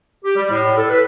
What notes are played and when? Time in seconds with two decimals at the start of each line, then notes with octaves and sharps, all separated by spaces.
0.24 G4
0.36 G3
0.51 A2
0.77 A4
0.89 B4